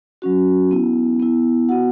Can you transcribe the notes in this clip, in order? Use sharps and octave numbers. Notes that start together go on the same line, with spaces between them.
F#3 C#4 F#4
B3 E4
B3 E4
B3 F#4 F#5